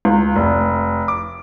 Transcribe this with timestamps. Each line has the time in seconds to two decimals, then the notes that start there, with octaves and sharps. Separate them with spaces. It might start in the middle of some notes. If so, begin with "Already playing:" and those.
0.05 C#2
0.36 F1
1.08 D6